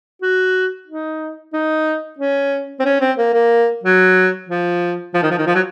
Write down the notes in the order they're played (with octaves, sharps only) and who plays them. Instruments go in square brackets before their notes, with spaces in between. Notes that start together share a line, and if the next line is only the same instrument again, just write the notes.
[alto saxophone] F#4
D#4
D#4
C#4
C4
C#4
C4
A#3
A#3
F#3
F3
F3
D#3
F3
D#3
F3
F#3